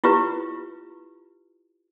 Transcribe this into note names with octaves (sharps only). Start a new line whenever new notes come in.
E4 F4 G4 B4